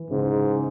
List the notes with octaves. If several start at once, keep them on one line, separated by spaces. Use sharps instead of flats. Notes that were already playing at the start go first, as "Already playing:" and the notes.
Already playing: E3
G#2 C#3